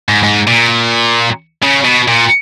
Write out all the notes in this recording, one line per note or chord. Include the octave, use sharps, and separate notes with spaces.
G#2
G#2
A#2
C#3
B2
A#2